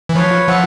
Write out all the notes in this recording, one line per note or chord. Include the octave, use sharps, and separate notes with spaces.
E3
F3 B4 C#5
F3 E5 F#5